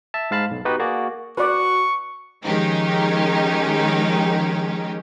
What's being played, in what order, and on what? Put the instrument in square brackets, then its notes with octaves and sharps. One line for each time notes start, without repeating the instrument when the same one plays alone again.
[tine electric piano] E5 A5
G#2 G#3 F5 A5 B5
B1
B3 D#4 F#4 G4 B4
A#3 F#4 G#4 D5
[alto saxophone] F#4 [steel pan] B4 D5 [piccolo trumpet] C#6
[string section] D#3 F3 G#3 C#4 D#4 G4